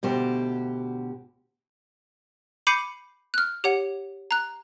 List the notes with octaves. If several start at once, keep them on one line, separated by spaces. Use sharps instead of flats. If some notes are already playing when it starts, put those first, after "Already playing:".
D2 B2 G4 C5
B5 D6 G6 C7 C#7 D#7
F6 F#6
G4 C#5 F#5
A#5 F#6